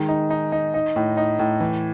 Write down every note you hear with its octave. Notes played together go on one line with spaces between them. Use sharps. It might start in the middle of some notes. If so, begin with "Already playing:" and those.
Already playing: D#3 G#3
D#4
D#4
D#4
D#4
A2
D#4
A2
E3